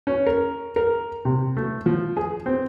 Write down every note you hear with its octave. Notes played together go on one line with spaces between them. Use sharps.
C#4
A#4
A#4
C3
A3
F3
G#4
C4